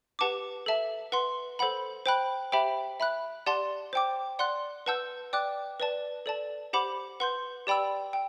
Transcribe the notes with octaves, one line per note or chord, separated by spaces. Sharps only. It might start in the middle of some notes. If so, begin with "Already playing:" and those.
G4 B4 F#5 A5 D6
A4 E5 A5
B4 F#5 C6
A4 C5 F#5 B5
C5 G5 B5 F#6
G4 C5 E5 G5 B5
E5 B5 F#6
G4 D5 F#5 A5 C6
C5 G5 D6
D5 F#5 C6 F#6
B4 F#5 A5 E6 G6
D5 G5 D6 F#6
B4 D5 A5
A4 D5 A5
G4 C5 F#5 B5 D6
B4 F#5 C6 G6
G4 D5 G5 B5 E6
G5